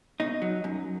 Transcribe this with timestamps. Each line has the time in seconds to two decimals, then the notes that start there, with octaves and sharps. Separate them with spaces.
0.20 B2 D#4
0.42 F#3
0.64 F#2